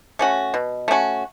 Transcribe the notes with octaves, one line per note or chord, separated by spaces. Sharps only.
A3 C#4 F#4
B2
A3 C#4 F#4